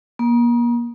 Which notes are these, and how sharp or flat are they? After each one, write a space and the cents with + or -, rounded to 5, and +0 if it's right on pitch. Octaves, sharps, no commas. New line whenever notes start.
A#3 +40